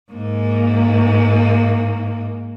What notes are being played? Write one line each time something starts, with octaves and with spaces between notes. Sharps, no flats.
G#2 A#3